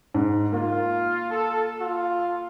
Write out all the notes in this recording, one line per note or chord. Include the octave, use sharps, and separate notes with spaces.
G#2
A#3 F4
A4
F4